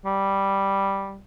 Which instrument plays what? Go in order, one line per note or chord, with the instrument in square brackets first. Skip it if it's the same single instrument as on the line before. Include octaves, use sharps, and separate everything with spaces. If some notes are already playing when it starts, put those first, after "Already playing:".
[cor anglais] G3